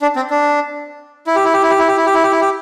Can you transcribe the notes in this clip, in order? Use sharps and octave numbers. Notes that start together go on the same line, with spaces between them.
D4
C4
D4
E4
G4
E4
G4
E4
G4
E4
G4
E4
G4
E4
G4
E4
G4